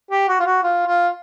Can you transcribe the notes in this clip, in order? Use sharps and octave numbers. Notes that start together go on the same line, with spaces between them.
G4
F#4
F4
F#4
F4
F4